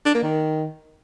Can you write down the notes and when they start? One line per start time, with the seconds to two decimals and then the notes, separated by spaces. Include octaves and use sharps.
0.06 D4
0.14 A#3
0.23 D#3